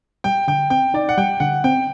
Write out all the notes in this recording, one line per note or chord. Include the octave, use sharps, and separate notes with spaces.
G3 G5
D3 G5
C4 G5
D#4 D5
F#5
G3 G5
D3 F#5
C4 G5